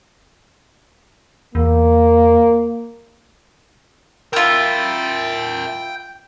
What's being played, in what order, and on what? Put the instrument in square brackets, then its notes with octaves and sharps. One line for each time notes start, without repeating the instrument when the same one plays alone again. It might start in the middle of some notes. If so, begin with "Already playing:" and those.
[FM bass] E2 [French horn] A#3
[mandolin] E4 F4 [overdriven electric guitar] A#4 E5 [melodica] G5